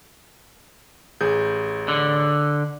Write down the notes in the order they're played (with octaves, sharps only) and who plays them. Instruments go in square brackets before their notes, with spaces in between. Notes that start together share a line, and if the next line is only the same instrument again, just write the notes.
[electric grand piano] A1 G#4 G6
[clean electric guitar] D3